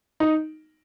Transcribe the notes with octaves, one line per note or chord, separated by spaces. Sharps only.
D#4